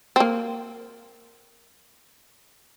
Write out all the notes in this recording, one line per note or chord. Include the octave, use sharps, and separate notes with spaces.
C4
A#3